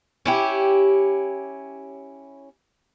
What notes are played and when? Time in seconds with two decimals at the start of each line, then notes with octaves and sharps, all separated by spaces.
0.26 C#4 E4 G4